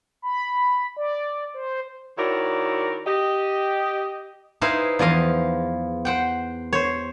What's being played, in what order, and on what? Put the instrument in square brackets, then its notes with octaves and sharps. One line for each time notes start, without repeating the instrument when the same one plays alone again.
[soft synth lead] B5
D5
C5
[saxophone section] D#3 E4 F#4 A#4 C#5 D5
G4 D#5
[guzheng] D#4 E4 G#4 B4 C5 F5
E2 F3 D#5 F5
C5 F#5 G5
C5 C#5